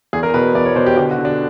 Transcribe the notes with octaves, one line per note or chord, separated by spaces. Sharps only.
E2 G#4
A#4
B2 B4
E2 D5
C#5
B2 C5
G4
D3 G4
F#4
D3
D4